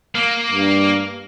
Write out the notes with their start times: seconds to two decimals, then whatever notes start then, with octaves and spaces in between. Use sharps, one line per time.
0.15 A#3
0.51 G2